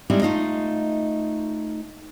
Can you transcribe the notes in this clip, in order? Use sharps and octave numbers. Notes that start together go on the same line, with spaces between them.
G3 G#3 C4 D#4 E4
A3 D#4 F4 D#5